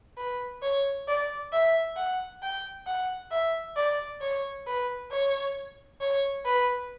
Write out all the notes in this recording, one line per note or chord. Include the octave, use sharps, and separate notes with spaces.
B4
C#5
D5
E5
F#5
G5
F#5
E5
D5
C#5
B4
C#5
C#5
B4